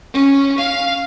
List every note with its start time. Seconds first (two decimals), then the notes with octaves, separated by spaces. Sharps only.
0.14 C#4
0.58 F5